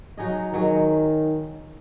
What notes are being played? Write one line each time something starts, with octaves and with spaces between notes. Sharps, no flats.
F#3 D#4 G#4 D#5
D#3 F#3 D#4 G#4 D#5